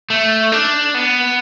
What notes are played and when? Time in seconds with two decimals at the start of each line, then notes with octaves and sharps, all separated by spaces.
0.10 A3
0.52 D4
0.94 B3